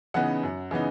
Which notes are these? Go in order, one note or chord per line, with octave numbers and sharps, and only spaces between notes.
C#3 E3 B3 D#4 F#5
F#2
C#3 E3 B3 D#4